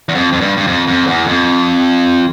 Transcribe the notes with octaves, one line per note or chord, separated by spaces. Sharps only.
E2
F2
F2
G2
G2
F2
F2
E2
F2